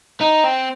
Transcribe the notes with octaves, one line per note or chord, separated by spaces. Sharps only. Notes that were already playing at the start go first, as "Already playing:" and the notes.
D#4
C4